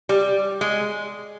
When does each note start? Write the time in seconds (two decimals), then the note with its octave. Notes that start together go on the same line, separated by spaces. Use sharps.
0.09 G3
0.61 G#3